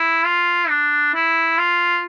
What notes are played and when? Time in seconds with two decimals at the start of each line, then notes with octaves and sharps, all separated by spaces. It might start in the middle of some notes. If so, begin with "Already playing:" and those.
Already playing: E4
0.25 F4
0.69 D4
1.14 E4
1.58 F4